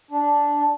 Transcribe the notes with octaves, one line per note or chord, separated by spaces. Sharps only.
D4